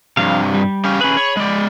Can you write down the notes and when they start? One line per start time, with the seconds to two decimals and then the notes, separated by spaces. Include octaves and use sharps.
0.17 G2 C3 F3 F5
0.54 G3
0.85 C#4 G4 F5
1.01 C#4 G#4 B4 B5
1.17 C#5
1.37 G#3 D5